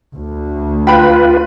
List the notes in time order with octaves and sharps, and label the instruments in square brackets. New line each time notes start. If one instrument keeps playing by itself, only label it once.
[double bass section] D2
[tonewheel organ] F4 B4 [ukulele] G5 B5